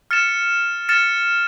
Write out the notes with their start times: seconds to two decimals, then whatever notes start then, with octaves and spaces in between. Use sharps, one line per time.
0.11 F6 A6 C#7 E7
0.89 F6 A6 C#7 E7